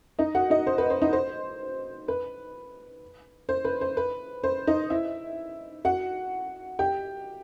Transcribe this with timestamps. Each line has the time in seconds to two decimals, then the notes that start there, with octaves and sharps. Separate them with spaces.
0.19 D#4 D#5
0.35 F#4 F#5
0.50 D#4 D#5
0.67 C5
0.78 B4
0.90 C5
1.02 D#4 D#5
1.13 C5
2.08 B4
3.49 C5
3.65 B4
3.81 C5
3.97 B4
4.44 C5
4.67 D#4 D#5
4.90 E4 E5
5.85 F#4 F#5
6.79 G4 G5